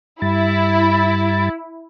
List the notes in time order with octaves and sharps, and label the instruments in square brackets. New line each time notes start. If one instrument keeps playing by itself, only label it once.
[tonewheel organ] G2 G3 A6 [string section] E4